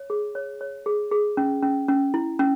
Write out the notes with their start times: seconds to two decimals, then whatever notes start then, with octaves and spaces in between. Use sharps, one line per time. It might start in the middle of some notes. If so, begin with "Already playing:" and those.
Already playing: C#5
0.10 G#4
0.35 C#5
0.61 C#5
0.86 G#4
1.12 G#4
1.37 C#4
1.63 C#4
1.88 C#4
2.14 E4
2.39 C#4